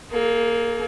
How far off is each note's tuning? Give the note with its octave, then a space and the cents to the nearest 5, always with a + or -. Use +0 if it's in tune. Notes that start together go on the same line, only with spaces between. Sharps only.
A#3 +0 G#4 +45